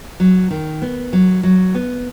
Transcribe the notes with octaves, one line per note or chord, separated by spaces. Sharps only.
F#3
D#3
B3
F#3
F#3
B3